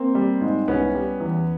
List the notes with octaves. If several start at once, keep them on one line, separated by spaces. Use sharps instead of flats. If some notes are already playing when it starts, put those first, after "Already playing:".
Already playing: A#3 C4
G3
G#2
C2 B3 C#4
G3
E2